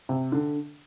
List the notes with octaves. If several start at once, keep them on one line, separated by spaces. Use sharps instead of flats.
C3
D3